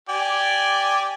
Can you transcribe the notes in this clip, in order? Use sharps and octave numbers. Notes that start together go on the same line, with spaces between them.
G4 D5 G#5